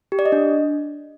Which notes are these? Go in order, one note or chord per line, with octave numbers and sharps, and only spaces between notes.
G4
D5
D#5
D4